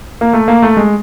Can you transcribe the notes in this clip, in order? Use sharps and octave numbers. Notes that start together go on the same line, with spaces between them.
A#3
A3
A#3
A3
G#3